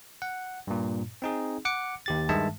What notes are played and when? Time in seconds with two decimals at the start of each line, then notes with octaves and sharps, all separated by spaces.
0.22 F#5
0.67 G2 A#2
1.22 C4 D#4 G#4
1.65 F#5 D6 C#7
2.06 D#2 G4 A6
2.29 G2 D#3 G#3 E5 A5